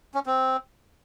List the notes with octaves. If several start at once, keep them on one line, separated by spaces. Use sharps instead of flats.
C#4
C4